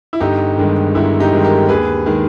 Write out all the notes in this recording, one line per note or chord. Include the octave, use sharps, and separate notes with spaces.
E4
G1 D#4 G4
G2 D#3 G#3
G1 E4
D#4 G4
G2 D#3 G#3
G4 A#4
D#2 G#4 B4
D#3 G#3